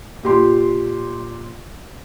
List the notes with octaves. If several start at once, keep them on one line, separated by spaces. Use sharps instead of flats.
A#2 G4 C6